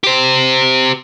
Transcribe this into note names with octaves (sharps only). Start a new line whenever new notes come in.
G4 C5